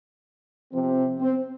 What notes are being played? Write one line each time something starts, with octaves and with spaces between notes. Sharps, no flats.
C3 F3 C4
C4